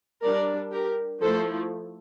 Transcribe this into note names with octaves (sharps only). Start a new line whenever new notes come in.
G3 D4 A#4 D5
G4 A#4
F3 A3 E4 A4 C5